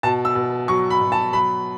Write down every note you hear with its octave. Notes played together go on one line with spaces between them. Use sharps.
B2 A5
E6
B2
F#3 C#6
B5
B2
A5
F#3 B5